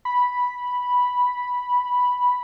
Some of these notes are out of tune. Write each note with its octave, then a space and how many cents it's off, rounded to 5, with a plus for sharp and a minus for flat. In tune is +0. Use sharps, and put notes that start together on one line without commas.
B5 -5